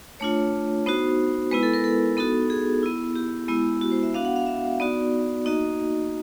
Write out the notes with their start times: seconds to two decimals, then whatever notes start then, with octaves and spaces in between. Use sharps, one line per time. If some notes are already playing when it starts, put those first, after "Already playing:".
0.20 A3 D4 F4 C#5
0.86 B3 D#4 F#4 C5
1.51 G#3 B3 E4 B4
1.63 A4
1.74 A#4
1.84 A4
2.17 B3 D#4 F#4 A4
2.50 G#4
2.83 B3 E4
3.16 G4
3.48 G#3 B3 E4
3.81 F#4
3.92 C5
4.03 E5
4.14 B3 D4 F#4 F5
4.25 F#5
4.36 F5
4.46 E5
4.80 B3 D#4 F#4 D5
5.45 A#3 D#4 F#4 D#5